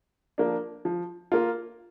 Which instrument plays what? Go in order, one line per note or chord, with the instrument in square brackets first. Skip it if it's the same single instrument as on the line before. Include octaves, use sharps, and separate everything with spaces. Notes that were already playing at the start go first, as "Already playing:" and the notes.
[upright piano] F3 A#3 D4
F3
A#3 F4